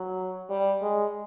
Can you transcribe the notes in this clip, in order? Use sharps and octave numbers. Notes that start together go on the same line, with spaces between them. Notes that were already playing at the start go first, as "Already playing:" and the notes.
Already playing: F#3
G3
G#3